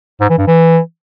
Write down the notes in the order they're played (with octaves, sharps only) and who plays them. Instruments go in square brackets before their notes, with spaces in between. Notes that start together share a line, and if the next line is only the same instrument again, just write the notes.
[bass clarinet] G#2
E3
G2
E3